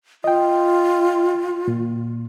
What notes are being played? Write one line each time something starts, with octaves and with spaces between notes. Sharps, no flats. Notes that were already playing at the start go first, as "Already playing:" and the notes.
F4 D#5 G5
A#2